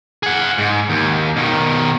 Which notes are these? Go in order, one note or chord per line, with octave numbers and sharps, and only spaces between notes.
G#4 F#5
G#2
D#2
B2 D#3